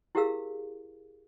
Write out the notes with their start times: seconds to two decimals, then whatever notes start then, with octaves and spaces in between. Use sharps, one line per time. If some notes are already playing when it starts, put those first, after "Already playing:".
0.15 E4 G4 G#4 A#4 F5 E6